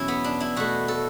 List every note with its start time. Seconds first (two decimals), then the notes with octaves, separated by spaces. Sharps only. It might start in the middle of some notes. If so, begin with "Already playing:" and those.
Already playing: E2 B2 F#3 C#4 E4
0.08 B3
0.24 D4
0.40 E4
0.56 B2 A3 F#4
0.88 A4